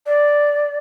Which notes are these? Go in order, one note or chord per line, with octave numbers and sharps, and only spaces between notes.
D5